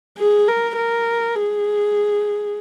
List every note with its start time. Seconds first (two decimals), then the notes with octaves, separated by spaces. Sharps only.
0.19 G#4
0.48 A#4
0.76 A#4
1.36 G#4